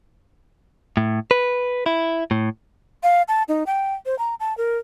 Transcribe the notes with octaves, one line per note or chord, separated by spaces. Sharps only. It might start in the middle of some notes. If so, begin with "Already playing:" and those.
A2
B4
E4
A2
F5
A5
D#4
G5
C5
A#5
A5
A#4